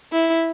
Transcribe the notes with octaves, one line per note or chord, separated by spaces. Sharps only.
E4